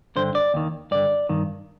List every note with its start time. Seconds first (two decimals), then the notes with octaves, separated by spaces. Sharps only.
0.16 G2 D3 C5
0.35 D5
0.54 D#2 D#3
0.91 G2 D3 D5
1.29 G2 D#3